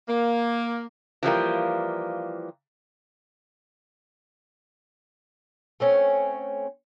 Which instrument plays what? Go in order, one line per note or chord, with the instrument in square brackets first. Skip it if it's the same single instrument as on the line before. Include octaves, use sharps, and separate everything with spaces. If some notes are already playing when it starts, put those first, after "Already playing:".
[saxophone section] A#3
[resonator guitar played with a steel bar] E3 F3 G3 A#3
[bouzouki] A3 C4 C#4